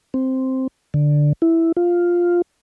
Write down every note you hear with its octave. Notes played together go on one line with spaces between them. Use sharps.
C4
D3
E4
F4